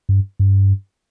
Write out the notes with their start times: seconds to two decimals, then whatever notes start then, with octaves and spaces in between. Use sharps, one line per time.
0.09 G2
0.39 G2